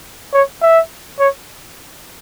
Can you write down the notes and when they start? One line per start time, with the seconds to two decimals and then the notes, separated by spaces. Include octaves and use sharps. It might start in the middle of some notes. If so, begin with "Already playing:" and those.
0.34 C#5
0.62 E5
1.20 C#5